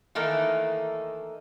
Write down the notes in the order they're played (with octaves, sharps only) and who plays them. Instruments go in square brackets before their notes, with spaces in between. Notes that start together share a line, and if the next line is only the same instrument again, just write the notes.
[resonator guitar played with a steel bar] D#3 E3 A3 A#3 D#4